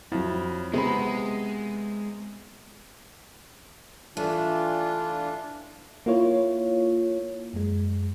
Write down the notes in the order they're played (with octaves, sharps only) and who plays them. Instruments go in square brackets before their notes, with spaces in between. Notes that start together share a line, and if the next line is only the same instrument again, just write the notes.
[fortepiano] F2 [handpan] F#3 E4
[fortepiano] C3 B5 [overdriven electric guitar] G#3 [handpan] B3 G#4 A#4
[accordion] E3 D4 F4 [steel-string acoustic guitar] A3
[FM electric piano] A#3 E4 F4 C#5
F#2 G#3